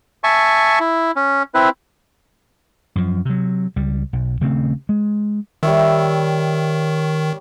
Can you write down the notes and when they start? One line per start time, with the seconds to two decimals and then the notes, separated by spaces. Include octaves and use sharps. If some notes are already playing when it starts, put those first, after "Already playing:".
0.24 E5 G#5 A5 C#6
0.80 E4
1.16 C#4
1.54 C4 E4 B4
2.96 F#2 F3
3.25 C3 F#3
3.76 C#2 G3
4.13 B1
4.41 D#1 C#3 A3 C4
4.89 G#3
5.63 D#3 G3 C#5 E5